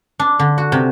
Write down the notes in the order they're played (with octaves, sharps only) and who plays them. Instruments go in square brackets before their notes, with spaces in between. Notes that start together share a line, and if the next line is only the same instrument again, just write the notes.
[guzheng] D4
D3
F#4
C3